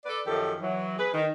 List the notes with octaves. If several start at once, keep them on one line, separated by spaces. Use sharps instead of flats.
A4 B4 D5
F#2 D#3 F3 G4 A4
E3 F#3
G#4 B4
D#3